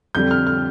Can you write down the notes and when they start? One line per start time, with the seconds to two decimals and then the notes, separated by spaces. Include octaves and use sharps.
0.15 F2 D3 G3 G6
0.31 F6
0.47 F6